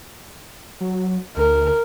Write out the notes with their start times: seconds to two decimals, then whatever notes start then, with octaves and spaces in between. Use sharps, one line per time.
0.81 F#3
1.37 D2 A#4